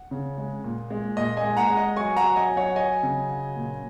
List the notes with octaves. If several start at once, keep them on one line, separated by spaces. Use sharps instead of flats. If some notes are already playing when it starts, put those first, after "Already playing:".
Already playing: F#5
C#3
G#3
A#2
G#3
A#2 D#5
D#5 G#5
G#3
F#5 A#5
G#3
D#5
F#3 G#5 C#6
F#5 A#5
F#3
D#5 G#5
F#3
C#5 F#5
F#3 D#5 G#5
C#3
F#3
A#2